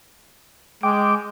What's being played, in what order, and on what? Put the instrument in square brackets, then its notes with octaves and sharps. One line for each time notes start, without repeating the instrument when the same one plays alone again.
[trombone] G#3 [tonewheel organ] G5 D6